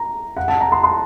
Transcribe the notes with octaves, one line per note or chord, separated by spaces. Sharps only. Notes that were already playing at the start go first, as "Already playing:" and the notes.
Already playing: A#5
F#5
A5
A#5
C6
C6